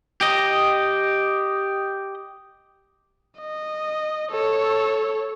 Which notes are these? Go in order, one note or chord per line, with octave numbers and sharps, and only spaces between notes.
G4 D#5
D#5
A4 C#5